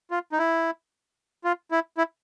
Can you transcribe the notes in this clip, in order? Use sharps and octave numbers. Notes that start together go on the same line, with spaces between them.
F4
D#4
E4
F4
E4
E4